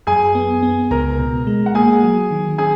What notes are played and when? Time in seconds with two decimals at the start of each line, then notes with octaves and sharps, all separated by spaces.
0.07 F#2 G#4 G#5
0.35 B3
0.63 B3
0.90 C#2 A#4 A#5
1.19 B2
1.47 G#3
1.66 F#5
1.74 A#3 G#4 G#5
2.04 F#3
2.31 D#3
2.58 C#4 G#4 G#5